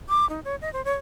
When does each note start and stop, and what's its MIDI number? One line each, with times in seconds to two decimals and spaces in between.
0.09 0.28 86
0.29 0.40 63
0.45 0.56 73
0.61 0.72 75
0.73 0.84 72
0.85 0.94 73